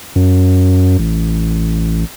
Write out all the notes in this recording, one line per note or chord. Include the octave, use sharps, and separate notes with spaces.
F#2
A1